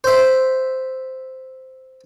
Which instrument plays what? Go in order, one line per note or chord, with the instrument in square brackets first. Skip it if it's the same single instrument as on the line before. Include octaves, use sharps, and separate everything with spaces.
[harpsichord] C5 E5